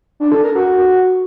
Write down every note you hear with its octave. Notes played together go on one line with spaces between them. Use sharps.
D4
A4
A#4
F#4